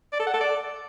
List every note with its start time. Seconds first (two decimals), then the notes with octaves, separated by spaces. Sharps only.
0.13 D5
0.20 A4
0.27 F#5
0.34 A4
0.41 D5